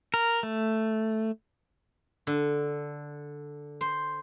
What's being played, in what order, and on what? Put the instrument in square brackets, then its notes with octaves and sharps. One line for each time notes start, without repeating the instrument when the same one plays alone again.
[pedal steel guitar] A#4
A3
[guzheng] D3
C5